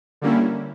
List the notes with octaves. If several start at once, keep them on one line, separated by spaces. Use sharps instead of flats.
D3 G3 A#3 C#4 E4